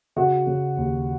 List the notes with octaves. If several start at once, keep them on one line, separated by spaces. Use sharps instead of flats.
C#3 F#4
C#3
D#2